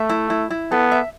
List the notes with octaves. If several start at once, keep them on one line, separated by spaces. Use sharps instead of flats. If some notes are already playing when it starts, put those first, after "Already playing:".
Already playing: A3 E5
E4
E4
E4
B3 A4
E5